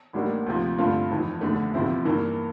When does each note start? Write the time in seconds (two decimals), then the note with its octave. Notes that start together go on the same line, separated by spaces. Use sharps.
0.13 A1 A2 G3 A#3 D4
0.46 D2 C3 F3
0.78 G2 D3 A3 C4 F4
1.10 F1 F2 E3
1.41 F1 E2 D3 A3
1.74 E2 C3 F3 C4 E4
2.05 G2 E3 A#3